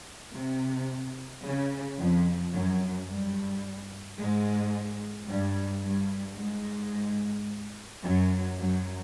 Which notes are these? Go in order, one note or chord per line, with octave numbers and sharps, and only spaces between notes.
C3
C#3
F2 F3
F#2 F#3
G2 G3
G#2 G#3
G2 G3
G2 G3
G#2 G#3
F#2 F#3
F#2 F#3